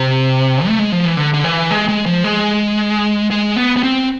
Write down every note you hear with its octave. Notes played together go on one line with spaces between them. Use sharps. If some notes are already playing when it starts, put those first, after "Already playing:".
Already playing: C3
A3
G#3
F3
E3
D3
D3
E3
G#3
G#3
F3
G#3
G#3
B3
B3
C4